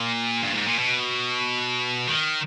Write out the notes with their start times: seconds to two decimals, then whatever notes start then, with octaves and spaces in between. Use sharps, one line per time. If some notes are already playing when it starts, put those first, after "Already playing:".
Already playing: A#2
0.43 G2
0.55 G#2
0.66 A#2
0.79 B2
2.08 D#3